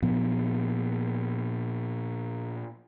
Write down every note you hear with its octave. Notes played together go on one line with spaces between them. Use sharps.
A#2 F3 B3